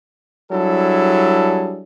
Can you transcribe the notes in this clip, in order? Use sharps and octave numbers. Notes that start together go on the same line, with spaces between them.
F#3 G3 D4 E4 G#4 A4